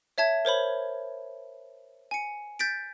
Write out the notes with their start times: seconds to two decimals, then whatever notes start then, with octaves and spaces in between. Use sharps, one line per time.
0.18 C#5 E5 A5 G#6
0.45 A#4 C5 C#5 B5
2.11 G#5 C#7
2.59 G6 A6 B6 D7